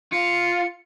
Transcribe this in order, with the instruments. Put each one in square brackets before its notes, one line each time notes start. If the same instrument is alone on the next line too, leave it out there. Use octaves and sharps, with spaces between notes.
[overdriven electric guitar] F4 [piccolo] C#7